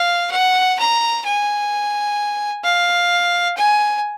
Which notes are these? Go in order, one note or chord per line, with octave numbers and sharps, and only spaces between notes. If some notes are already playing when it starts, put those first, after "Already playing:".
Already playing: F5
F#5
A#5
G#5
F5
G#5